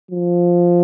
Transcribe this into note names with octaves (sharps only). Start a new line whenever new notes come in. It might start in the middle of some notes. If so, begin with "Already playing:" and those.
F3